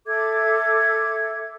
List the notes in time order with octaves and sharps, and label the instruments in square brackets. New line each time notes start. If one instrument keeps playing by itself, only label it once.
[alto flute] A4 [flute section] E5 D6 G#6